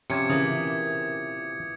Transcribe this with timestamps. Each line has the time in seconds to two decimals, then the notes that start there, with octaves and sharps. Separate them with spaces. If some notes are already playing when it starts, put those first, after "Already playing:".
0.10 C3 F3 C#4 G#5 D6 G#6 C#7
0.30 A#2 C#3 E3 D#6 G#6